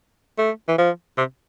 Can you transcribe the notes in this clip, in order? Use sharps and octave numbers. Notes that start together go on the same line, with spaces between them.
A3
E3
F3
C3